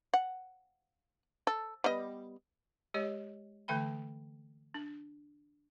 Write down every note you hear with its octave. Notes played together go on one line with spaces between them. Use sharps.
F#5
A4
G3 B3 D#5
G#3 G4 C#5 D#5
D3 E3 A3 G5 B5
D4